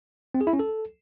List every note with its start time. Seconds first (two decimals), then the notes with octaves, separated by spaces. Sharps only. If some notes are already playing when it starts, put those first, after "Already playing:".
0.34 C4
0.41 G#4
0.47 E4
0.53 C#4
0.59 A4